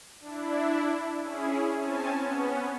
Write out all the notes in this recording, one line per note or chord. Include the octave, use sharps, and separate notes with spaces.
D4 E4
C#4 E4 G#4
C4 C#4 G#5 A5
B3 C#4